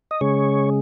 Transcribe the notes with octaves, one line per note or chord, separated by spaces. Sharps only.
D#5
C#3 G#3 C#5